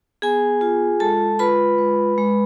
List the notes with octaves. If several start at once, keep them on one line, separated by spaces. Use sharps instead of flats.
B3 G#4 G#5
F4
G#3 A4 A5
F4 B4 B5
G#3
G#3